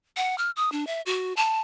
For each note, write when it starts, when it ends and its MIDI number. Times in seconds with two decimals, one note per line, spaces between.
0.17 0.37 78
0.38 0.50 89
0.56 0.72 87
0.72 0.87 62
0.87 1.01 76
1.06 1.33 66
1.36 1.60 81